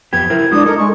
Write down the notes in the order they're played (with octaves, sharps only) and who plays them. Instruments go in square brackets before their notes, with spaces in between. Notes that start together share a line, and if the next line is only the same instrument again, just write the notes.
[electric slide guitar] F2 B3 G4 [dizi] G#6
[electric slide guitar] E4 A#4 C5
[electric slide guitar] G#3 E4 F#4 [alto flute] D4 [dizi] D#6
[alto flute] D#4 [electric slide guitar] A4 [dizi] A#4
[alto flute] G#3 [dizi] C#6